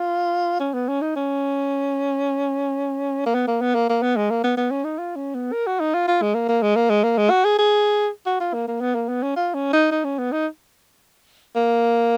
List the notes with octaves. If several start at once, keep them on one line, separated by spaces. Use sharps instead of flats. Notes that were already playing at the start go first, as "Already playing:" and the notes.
Already playing: F4
C#4
B3
C#4
D#4
C#4
A#3
B3
A#3
B3
A#3
A#3
B3
G#3
A#3
B3
B3
C#4
D#4
F4
C#4
B3
A#4
F#4
D#4
F4
F4
G#3
A#3
A#3
G#3
A#3
G#3
A#3
G#3
F#4
G#4
G#4
F#4
F4
A#3
A#3
B3
A#3
B3
C#4
F4
C#4
D#4
D#4
C#4
B3
D#4
A#3